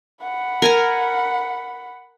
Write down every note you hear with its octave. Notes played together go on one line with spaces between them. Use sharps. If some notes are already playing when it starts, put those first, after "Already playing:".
F#5 B5
A#4 G#5 A#5